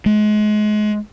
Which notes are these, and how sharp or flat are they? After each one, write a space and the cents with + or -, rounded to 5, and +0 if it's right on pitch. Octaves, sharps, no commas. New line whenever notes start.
G#3 +30